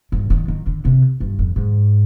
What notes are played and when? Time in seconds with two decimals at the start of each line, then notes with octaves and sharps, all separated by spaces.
0.12 G2
0.30 D#3
0.48 D#3
0.66 D3
0.85 C3
1.20 G2
1.39 F2
1.56 G#2